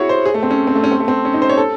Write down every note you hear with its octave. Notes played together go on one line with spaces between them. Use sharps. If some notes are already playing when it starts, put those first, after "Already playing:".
Already playing: E4 F#4 G#4 C#5
C5
G#4
A3
C4
C#4
C4
A3
C#4
C4
A3
C4
C#4
D#4
C5
C#5
A4